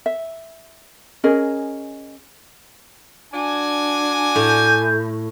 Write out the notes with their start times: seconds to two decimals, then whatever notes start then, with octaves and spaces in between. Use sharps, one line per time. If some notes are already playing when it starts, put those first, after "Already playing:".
0.06 E5
1.24 C#4 G#4 A#4 D#5
3.33 D4 F#4 D5 G#5
4.36 A2 G6